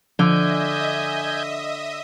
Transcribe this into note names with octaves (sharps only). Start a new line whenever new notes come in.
D3 F3 D#5 E5 G#5 D#6 G6